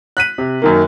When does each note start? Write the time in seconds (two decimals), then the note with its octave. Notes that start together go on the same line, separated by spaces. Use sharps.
0.17 F#6 B6 D#7
0.38 C3
0.62 F#2 D#3 A#3